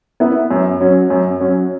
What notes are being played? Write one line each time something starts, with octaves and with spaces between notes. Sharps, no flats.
B3 E4 B4 E5
F#2
F#3 C#4
F#2
F#3 C#4